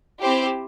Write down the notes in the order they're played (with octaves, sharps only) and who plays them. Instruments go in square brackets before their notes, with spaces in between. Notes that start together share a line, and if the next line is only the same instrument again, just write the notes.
[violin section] C4 E4 G4 C5